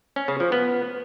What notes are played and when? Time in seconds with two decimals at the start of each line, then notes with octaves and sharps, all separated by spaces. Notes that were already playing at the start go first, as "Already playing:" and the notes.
0.16 C#4
0.28 C#3
0.40 F3
0.52 B3